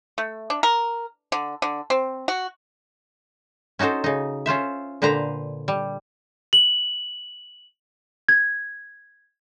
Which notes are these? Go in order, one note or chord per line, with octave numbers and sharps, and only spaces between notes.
A3
D4
A#4
D3
D3
C4
F#4
C#4 D#4 F#4 A4 C5
C#3 D#4
C#4 F4 C5 E5
A#2 D3 B4 C5 A#5
G3
F#7
G#6